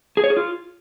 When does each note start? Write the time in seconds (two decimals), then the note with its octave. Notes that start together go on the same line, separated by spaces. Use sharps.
0.17 G#4
0.24 C#5
0.30 G#4
0.37 F4